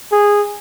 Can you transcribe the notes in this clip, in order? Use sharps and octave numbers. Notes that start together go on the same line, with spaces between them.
G#4